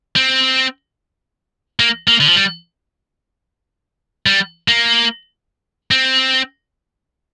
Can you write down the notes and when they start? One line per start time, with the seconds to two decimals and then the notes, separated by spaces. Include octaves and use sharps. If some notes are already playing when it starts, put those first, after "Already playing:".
0.16 C4
1.80 A#3
2.08 A#3
2.20 D3
2.28 F3
2.35 G3
4.26 G3
4.68 A#3
5.91 C4